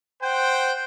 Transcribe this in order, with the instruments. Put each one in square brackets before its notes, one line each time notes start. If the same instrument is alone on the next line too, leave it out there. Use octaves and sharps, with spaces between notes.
[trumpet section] C5 F#5 G5